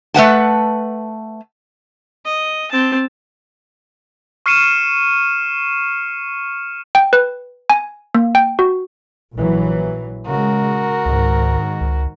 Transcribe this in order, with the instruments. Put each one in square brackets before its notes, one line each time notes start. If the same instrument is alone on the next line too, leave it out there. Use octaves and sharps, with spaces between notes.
[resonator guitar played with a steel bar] A3 B4 F#5 A5
[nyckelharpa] D#5
C4 A5
[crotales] C#6 F6 C7 C#7 D#7 E7
[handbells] G5
B4
G#5
A#3
G5
F#4
[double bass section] A#1 E3 F#3
[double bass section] C#3 G#3 [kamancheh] F#4 A#4
[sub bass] C#2 [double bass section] G#2 D#3
[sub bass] C#2